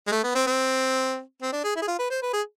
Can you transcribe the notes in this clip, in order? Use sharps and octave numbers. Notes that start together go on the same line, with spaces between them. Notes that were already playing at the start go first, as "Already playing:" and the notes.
G#3
A3
B3
C4
C4
C4
D4
G#4
E4
G#4
F4
B4
C5
B4
G#4